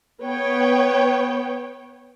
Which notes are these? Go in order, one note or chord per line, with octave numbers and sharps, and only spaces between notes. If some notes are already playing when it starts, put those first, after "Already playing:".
B3 B4 C#5 G5